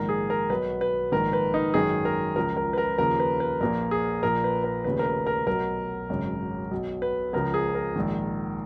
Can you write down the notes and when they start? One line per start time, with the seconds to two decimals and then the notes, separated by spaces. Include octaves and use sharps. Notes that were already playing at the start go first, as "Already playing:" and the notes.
Already playing: A#1 G#2 D#3 A#4
0.09 G#4
0.30 A#4
0.50 B1 B2 B4
0.81 B4
1.12 A#1 G#2 D#3 A#4
1.33 B4
1.54 D#4
1.74 G#1 F#2 D#3 G#4
2.05 A#4
2.36 C#2 C#3 F3 A#4
2.57 A#4
2.73 B4
2.78 A#4
2.98 D#2 C#3 F3 A#4
3.20 B4
3.40 B4
3.60 A#1 A#2 F3 A#4
3.91 G#4
4.23 A#1 A#2 F3 A#4
4.44 B4
4.64 A#4
4.84 F1 D#2 C#3 F3 B4
4.99 A#4
5.05 B4
5.27 A#4
5.47 B1 B2 A#4
6.09 G#1 F#2 C#3
6.71 B1 B2
7.02 B4
7.33 C#2 C#3 F3 A#4
7.54 G#4
7.75 A#4
7.96 A#1 G#2 D#3